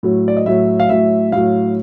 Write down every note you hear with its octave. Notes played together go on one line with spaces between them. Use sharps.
A2 F#3
D5
D#5
A2 F#3 E5
F5
A2 F#3 E5
A2 F#3 F5